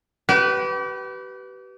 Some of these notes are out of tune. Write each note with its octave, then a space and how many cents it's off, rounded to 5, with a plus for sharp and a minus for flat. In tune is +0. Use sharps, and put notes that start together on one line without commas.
G4 -35 B4 +0